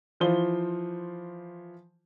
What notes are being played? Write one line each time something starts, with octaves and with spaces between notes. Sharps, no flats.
E3 F3 F4 C5 G7